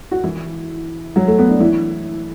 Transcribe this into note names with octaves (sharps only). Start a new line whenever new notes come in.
F#4
E3 E4
F#3
A3
B3
D4
E3 E4